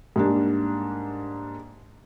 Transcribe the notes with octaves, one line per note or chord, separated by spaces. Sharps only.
G#2 G3 A#3 D4